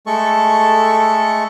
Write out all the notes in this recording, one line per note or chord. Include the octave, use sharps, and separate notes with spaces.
G#3 A3 A4 C#6